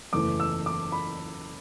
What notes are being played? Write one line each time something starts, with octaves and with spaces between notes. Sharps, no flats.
F#1 E2 E3 A3 D6
E6
D6
B5